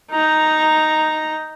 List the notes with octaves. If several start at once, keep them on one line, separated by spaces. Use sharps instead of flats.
D#4 A#5